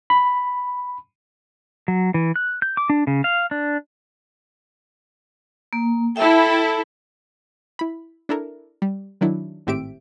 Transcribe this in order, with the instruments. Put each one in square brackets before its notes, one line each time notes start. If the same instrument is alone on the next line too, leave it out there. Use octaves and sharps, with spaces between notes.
[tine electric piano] B5
[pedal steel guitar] F#3
E3
F#6
G6
D6
D4
C#3
F5
D4
[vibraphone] A#3
[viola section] E4 A4 [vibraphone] E5 G5
[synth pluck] E4 B5
D4 E4 A4 A#4
G3
D#3 F#3 D4 E4
G#1 A2 C4 G4 E5 D7